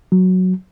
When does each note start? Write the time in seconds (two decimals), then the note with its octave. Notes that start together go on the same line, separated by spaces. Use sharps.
0.12 F#3